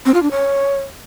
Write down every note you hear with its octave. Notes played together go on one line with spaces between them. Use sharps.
C4
F4
D4
C#5